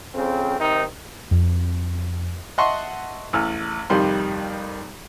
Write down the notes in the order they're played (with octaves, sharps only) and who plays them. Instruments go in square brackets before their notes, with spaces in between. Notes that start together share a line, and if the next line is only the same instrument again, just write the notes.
[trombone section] F2 C#3 C4
C3 D#3 C4 D#4
[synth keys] F2
[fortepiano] D#5 E5 F#5 A5 C6 C#6
A1 E2 E6 F6
F2 C3 D#3 G3 C6